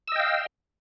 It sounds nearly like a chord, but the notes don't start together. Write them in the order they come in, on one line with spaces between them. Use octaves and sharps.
E6 D#5 G5 F5